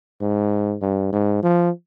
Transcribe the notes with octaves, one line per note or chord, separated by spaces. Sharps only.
G#2
G2
G#2
F3